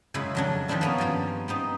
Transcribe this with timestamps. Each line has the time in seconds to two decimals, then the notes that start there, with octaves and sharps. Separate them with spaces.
0.14 F#2 C#3 G#3 E4 E5 B5
0.35 F2 F#3 D4
0.68 D#3 F3 G3 C4 D4 E4
0.81 A#3 B3 C#4
0.98 G2 F3 A#3 F4
1.48 B3 C4 D#4